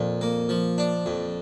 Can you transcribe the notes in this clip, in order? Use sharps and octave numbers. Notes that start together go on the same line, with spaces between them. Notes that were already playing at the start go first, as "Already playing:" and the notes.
Already playing: F2 A#2
A#3
F3
D4
F2